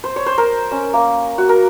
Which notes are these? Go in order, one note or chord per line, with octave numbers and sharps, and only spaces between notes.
C5
C#5
C5
A#4
C#4
A#3
F#4
A#4